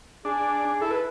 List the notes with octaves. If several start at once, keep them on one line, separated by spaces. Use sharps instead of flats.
D4 G#4
E4 A4
B4